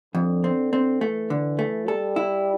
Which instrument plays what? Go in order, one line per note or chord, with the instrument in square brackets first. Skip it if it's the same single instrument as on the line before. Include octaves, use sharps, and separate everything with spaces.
[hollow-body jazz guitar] F2 [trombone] D3
[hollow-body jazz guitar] C4
C4
[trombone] E3 [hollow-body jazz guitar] A3
[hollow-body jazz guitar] D3
A3
[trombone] G3 [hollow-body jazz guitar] A4
[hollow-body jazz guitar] E4